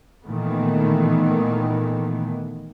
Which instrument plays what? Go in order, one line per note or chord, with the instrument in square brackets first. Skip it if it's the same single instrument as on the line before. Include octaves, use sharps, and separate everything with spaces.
[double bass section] A#2 D#3 E3 A3 B3